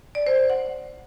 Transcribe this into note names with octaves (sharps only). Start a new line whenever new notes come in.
D5
C5
C5
F#5